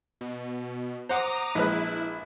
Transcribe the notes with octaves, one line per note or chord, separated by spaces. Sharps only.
B2
C5 F#5 A#5 D6 D#6
A#1 G#3 E4 B4